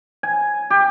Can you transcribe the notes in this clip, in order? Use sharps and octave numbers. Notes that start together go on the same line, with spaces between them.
G#5
G4